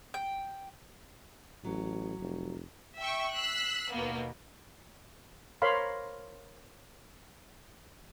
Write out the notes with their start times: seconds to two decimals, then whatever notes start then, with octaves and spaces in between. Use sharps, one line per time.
0.14 G5
1.64 A1 F#3
2.21 F1
2.98 E5 G5 C#6
3.35 E6 F#6 B6 C7
3.92 D#2 B2 A#3 B3
5.62 A#4 C5 C#5 F5 B5 C6